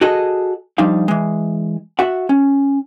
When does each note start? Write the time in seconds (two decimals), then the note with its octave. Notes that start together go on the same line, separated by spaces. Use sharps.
0.01 F#4 G#4 A4 D#5
0.78 F3 G3 D4 D#4 F5
1.08 E3 G#3
1.99 F#4 E5 F#5
2.29 C#4